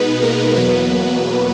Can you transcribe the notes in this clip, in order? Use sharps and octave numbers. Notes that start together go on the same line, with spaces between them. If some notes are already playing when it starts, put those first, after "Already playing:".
Already playing: B2 G#3 B3 D#4 B4
A#3 A#4
E2 B2 F#3 A#3 B3 B4